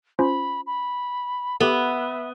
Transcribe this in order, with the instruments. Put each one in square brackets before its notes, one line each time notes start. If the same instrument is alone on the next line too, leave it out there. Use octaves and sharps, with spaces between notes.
[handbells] C#4 F4 C5 [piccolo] B5
[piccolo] B5
[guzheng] B3 [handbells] G4 A4 [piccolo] E5